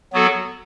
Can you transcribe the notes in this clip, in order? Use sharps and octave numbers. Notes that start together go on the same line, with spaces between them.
F#3 B3 F#4 A4